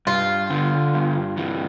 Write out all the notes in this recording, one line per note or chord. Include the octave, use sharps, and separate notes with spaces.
G2 F4
D3
G2
E3